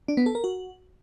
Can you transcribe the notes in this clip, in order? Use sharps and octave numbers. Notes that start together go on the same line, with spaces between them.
D4
B3
A4
A#4
F#4